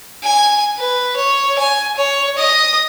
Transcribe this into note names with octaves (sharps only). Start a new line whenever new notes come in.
G#5
B4
C#5
G#5
C#5
D#5 D#6